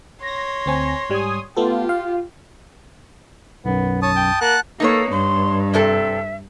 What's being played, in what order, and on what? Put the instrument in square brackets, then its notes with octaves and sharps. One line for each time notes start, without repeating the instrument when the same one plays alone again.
[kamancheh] C#5 C6 [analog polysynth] A#6
[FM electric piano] D2 C4 G#5
[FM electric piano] G#2 G3 [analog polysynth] G#5 D#6
[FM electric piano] A3 B3 A4 [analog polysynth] F4 [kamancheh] G4
[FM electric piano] F5
[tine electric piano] B1 F#2 [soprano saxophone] B3
[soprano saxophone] C#5 [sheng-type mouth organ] A5 D#6
[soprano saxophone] G5
[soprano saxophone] A#3 [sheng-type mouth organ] F#5 A5 F#6
[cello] A#3 [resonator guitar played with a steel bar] D#4 B4 C#5 [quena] A4
[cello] G2 [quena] C6
[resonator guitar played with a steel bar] C3 C4 A4 [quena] E5